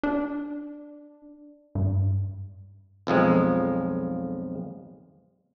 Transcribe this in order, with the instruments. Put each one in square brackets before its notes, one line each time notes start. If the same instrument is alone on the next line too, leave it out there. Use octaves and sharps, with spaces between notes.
[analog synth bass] D4
G2
[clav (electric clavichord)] B1 F2 F3 G#3